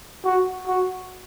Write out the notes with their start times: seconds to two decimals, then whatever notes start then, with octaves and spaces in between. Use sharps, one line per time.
0.24 F#4
0.67 F#4